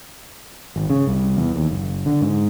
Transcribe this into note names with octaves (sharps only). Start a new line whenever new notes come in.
G#1
C#3
C2
E2
D#2
F#1
D3
G#2